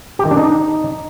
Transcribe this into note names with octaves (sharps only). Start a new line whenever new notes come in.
G4
D#3
D4
D#4